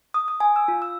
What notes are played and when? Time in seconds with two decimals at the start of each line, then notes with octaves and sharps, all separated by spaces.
0.14 D#6
0.28 D#6
0.40 G#5
0.56 E6
0.68 F4
0.82 E6